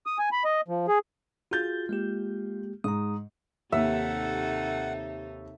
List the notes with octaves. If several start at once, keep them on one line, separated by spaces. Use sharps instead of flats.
D#6
G#5
B5
D#5
F3
G#4
F4 F#4 G#4 G6 A6
G#3 A#3 G4
G#2 A#5 D#6
D#2 C3 D#4 A4 E5 F#5